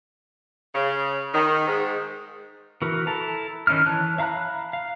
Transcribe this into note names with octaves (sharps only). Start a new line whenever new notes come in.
C#3
D#3
G#2
E3 F#4 A#4 B4
E4 A4 A5 A#5
D#3 C#4 D#4 E4 F6
E3 C#5 A5 F#6
E5 F5 A#5 B5 F#6
F5